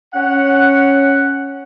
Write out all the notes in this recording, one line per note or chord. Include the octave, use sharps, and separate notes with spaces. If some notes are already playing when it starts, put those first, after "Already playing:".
C#4 F#5